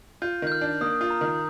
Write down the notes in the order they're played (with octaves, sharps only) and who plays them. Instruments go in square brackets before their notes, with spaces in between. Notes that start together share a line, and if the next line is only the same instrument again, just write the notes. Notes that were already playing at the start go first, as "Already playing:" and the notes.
[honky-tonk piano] F4 [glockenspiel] G6
[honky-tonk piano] D#3 [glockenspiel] G6
[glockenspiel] F6
[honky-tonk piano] D4
[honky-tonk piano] A#3 [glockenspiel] D#6
[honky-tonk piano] F4
[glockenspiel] A#5
[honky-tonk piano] D#3